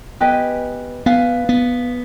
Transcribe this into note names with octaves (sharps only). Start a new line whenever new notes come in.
B3 G4 B4 D#5 G#5
B3 B4 F5 G#5
B3